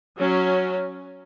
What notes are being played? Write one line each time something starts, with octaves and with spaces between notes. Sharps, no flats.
F#3 C#4